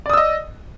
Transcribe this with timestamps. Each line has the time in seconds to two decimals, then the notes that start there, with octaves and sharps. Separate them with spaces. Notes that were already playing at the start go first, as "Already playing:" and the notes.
0.06 D5
0.10 D#6
0.13 E6
0.17 D#5